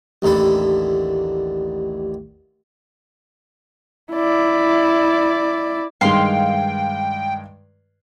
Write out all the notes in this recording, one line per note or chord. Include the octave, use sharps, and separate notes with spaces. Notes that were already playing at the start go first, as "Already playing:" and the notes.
A1 D#2 D3 A4 B5
E4 D5
G2 D#3 G#3 F5 G5 C6